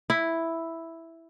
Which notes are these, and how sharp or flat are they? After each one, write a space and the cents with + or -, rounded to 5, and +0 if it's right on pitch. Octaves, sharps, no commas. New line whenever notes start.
E4 +0